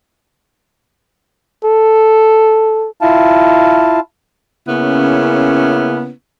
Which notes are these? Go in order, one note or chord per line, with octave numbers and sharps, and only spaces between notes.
A4
E4 F4 F5 A5
C#3 A#3 B3 C#4 E4